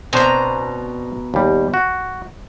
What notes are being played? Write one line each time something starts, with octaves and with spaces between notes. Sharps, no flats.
B2 C4 D4 C5 A#5
D#2 G3
F#4